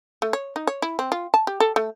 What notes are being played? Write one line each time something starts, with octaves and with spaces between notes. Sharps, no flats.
A3
C#5
D#4
C#5
E4
C4
F4
A5
G4
A4
A3